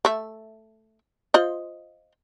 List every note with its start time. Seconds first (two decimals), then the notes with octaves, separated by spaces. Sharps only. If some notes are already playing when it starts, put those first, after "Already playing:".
0.05 A3 E5
1.34 F4 C5 D#5